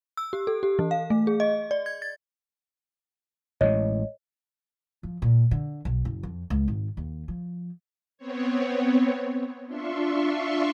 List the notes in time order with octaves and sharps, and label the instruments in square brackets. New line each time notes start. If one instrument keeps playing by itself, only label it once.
[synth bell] E6
G4
A4
G4
E3
F5
A3
G#4
D#5
D5
G#6
A6
[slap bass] A1 A2 G#3 [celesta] C#5 D#5
[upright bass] F3
A#2
D3
B1
F#1
F2
C#2
G#1
D#2
F3
[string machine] B3 C4 C#5
D4 F4 E5 C6 C#6